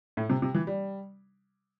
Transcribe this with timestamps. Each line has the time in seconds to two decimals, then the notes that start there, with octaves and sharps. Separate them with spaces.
0.17 A2
0.30 C3
0.42 C3
0.55 E3
0.67 G3